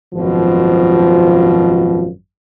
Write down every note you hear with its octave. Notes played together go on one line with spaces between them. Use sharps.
G#1 F#2 B2 F3